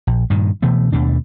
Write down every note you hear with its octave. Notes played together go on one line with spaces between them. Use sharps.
A#1
G2 A#2 D#3
B2 E3 A3 B3
D#2 B2 A3 D4